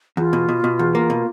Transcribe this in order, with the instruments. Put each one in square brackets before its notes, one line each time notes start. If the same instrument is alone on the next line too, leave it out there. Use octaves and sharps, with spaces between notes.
[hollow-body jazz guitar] E2 [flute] F4
[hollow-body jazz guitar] B2
B2
B2
E2
A#3
B2